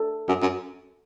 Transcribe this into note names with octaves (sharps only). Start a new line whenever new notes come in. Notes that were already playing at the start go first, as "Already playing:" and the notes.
Already playing: A4
F#2
F#2